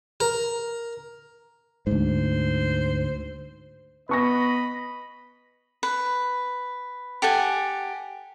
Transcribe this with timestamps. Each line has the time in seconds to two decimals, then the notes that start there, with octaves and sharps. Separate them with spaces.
0.20 A#4
1.87 D2 G#2 C5
4.09 B3 D#5 B5 C#6 A#6
5.83 B4
7.22 G4 A4 F#5 G#5